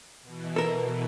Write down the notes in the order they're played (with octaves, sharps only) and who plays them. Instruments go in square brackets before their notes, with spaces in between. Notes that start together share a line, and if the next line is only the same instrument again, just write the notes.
[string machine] B2 E3
[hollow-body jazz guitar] A4 A#4